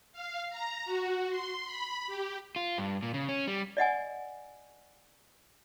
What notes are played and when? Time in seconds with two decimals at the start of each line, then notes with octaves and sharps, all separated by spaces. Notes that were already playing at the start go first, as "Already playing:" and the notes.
0.13 F5
0.50 A#5
0.86 F#4
1.30 C6
1.65 B5
2.07 G4
2.56 F4
2.78 G2
3.03 A#2
3.14 C#3
3.29 C#4
3.47 G3
3.77 D5 D#5 F#5 G#5